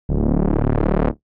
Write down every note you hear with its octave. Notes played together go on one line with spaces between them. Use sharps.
D1